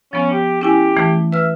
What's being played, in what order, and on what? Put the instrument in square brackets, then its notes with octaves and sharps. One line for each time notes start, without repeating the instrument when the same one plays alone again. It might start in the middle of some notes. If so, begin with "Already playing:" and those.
[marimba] F3 B3 [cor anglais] C#4
[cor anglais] G4
[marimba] C#4 E4 G#5 [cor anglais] G4
[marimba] E3 A3
[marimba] B4 F6 [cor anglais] E5